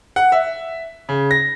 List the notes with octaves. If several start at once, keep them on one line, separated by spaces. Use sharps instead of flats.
F#5
E5
C#3
A#6